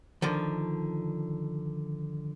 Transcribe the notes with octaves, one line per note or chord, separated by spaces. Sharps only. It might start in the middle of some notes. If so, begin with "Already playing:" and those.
D3 D#3 F3